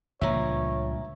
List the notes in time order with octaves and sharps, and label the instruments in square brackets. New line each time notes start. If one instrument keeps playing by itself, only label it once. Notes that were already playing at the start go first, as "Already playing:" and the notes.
[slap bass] C#2 F3 [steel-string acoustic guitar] G2 A#2 [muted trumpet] C#5 [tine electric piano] E5 A#5